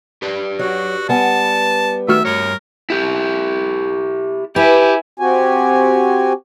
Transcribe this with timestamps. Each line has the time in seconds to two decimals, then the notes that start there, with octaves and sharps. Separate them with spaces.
0.22 G4 B4 D5
0.59 F#3 F#4
1.09 G3 B3 G#5 A5
2.08 D#3 A3 F#4 E5 F6
2.25 G2 A#4 C#5
2.90 E4 G4
4.56 E4 G4 B4 G#5
5.20 C4 F#4 G4 G#5